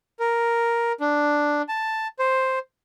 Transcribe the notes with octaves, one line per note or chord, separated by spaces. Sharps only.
A#4
D4
A5
C5